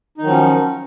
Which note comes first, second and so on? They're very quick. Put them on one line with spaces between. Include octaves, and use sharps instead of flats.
D#4 D#3 F#3 F3 C#4